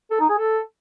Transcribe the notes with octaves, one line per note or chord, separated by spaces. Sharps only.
A4
D#4
G#4
A4